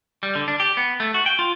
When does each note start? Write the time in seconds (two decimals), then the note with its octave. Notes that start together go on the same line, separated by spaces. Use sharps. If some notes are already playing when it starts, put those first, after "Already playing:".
0.23 G3
0.35 D3
0.48 D4
0.60 G4
0.77 B3
1.00 A3
1.14 F#4
1.26 G5
1.39 F4